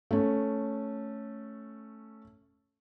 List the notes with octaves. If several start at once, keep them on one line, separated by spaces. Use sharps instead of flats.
A3 C#4